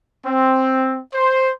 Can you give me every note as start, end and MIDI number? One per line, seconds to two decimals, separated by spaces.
0.26 1.00 60
1.14 1.52 72